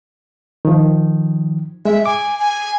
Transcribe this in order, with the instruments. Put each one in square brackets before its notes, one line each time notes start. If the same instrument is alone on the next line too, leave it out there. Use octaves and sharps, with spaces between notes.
[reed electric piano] D#3 F3
[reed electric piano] G#3 [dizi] E5
[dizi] G#5 [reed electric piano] D6
[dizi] G#5